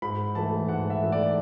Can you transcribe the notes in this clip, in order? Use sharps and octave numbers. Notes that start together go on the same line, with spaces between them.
G#2 B5
E3 A3 A5
G#2 F#5
E5
E3 A3
D5